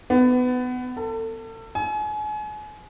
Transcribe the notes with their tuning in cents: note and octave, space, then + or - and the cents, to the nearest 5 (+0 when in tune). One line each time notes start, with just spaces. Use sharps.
B3 +20
A4 +35
G#5 +35